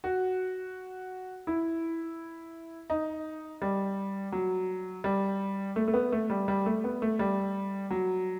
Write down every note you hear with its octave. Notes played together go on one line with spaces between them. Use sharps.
F#4
E4
D#4
G3
F#3
G3
A3
A3
B3
A3
G3
G3
A3
B3
A3
G3
F#3